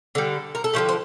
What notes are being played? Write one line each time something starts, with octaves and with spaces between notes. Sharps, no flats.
D3 G3 A4
A#4
A4
D3 F3 A3 G4
C5